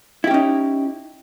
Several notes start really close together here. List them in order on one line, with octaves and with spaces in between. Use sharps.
E4 G4 C#4 D#4